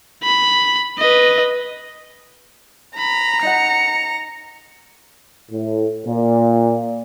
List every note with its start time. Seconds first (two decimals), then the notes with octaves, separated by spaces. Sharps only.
0.24 B5
0.98 B4 D#5
2.98 A#5 B5
3.43 D#4 D#5 F#5 C#7
5.51 A2
6.07 A#2